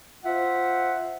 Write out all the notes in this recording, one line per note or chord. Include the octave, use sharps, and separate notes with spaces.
F4 C5 E5 F#5